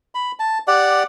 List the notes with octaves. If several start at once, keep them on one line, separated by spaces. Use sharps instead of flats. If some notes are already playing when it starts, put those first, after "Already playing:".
B5
A5
G4 D5 F#5